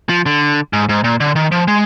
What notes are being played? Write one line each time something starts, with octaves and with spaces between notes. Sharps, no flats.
F3
D3
G#2
G#2
A#2
D3
D#3
F3
G#3